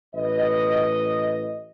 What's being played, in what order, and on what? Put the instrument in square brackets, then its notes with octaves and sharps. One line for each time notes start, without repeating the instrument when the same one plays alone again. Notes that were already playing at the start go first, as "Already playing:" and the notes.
[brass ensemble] A1 B4 D#5